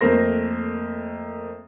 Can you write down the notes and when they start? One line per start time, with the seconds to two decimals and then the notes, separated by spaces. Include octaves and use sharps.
0.01 F2 A3 A#3 A#4 C5 A#6